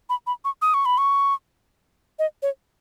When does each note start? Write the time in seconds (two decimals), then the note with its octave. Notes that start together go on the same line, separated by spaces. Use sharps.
0.09 B5
0.27 B5
0.45 C#6
0.62 D#6
0.74 C#6
0.86 B5
0.98 C#6
2.19 D#5
2.42 C#5